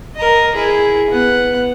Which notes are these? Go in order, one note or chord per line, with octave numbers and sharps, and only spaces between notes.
A#4 D#5
E4 G#4
B3 F#5